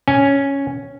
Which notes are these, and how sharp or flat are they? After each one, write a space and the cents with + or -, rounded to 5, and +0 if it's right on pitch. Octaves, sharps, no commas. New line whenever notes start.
C#4 +0 G#5 +0